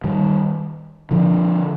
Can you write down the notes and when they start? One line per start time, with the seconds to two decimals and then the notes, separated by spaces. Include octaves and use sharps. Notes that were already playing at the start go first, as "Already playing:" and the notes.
0.04 D#3 G3
1.11 D3 F3